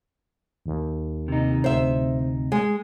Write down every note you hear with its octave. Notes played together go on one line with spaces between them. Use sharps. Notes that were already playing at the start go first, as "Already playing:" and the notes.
D#2
C3 D#4
D1 C5 E5
G#3